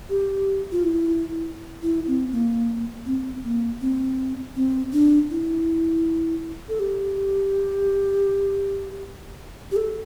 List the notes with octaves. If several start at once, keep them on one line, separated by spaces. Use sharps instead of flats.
G4
F4
E4
E4
C4
A#3
C4
A#3
C4
C4
D4
E4
A4
G4
G4
A4